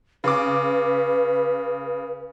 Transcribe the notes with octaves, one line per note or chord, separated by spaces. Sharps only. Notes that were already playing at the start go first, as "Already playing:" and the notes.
C#3 B4 D6